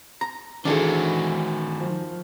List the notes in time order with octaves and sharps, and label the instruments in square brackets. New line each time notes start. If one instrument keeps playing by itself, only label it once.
[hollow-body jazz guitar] A#5
[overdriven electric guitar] D#3 F#4 [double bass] E3 [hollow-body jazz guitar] D4 G#4 A4
[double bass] F3